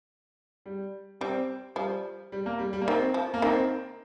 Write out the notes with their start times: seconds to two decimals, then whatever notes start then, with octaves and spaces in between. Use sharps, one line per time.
0.66 G3
1.21 G3 C4
1.76 F3 G3
2.32 G3
2.46 A#3
2.59 G3
2.73 G3
2.81 A#3
2.88 D#3 C4
3.14 F3
3.34 A#3
3.42 D#3 C4